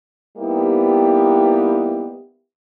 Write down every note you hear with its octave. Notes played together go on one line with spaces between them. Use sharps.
G3 A#3 B3 D#4 E4 G4